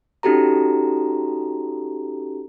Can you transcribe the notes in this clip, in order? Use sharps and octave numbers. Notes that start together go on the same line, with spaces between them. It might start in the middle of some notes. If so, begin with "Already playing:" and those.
C#4 D#4 F#4 G4 A4 A#5